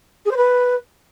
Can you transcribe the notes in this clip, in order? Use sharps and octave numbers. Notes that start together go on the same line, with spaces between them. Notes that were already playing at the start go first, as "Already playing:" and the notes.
G#4
C5
B4